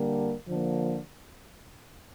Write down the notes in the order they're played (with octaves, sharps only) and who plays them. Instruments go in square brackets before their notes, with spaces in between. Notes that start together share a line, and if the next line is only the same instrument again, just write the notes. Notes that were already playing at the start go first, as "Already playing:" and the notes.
Already playing: [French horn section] D3 G3 A#3
D3 F3 A#3